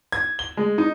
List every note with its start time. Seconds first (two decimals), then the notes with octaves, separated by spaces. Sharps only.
0.12 G#6
0.39 G7
0.57 G#3
0.78 D#4